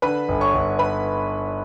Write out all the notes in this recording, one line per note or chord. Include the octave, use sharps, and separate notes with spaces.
D3 B4 B5
G1
C#5 C#6
G1
B4 B5